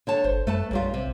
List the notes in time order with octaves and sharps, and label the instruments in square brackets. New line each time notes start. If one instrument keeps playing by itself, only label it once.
[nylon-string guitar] D3 C#5 A5
[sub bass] G1 [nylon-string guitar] C5
[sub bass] F#2 [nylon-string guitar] A3 B4 A5
[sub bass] A#1 [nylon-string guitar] F#2 G3 F4
[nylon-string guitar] C3